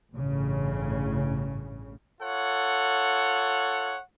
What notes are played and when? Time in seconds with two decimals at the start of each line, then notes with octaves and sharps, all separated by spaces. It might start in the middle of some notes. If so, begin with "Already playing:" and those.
0.13 A1 G2 C#3
2.21 F4 A4 C#5 F#5